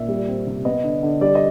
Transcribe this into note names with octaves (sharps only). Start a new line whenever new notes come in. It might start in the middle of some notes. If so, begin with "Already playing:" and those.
Already playing: A#2 E5
G3
C4
C3
B3 D#5
D3
D3
G3 D5
D#5